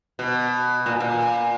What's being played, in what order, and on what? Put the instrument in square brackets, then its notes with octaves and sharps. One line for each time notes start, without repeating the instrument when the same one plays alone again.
[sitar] B2
A#2
A#2